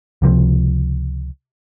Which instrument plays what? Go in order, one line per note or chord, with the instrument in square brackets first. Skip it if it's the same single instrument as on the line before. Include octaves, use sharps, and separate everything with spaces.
[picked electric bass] C#2 C3 F3